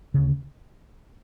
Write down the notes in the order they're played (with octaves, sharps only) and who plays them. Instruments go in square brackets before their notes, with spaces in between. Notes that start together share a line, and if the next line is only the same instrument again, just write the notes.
[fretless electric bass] D2 C#3